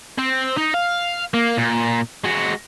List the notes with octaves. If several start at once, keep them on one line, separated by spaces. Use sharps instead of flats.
C4
D#4
F5
A#3
A#2
G#3 F#4